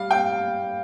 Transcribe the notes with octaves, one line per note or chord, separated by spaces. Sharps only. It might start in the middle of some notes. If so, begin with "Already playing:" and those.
Already playing: G3 F5
G5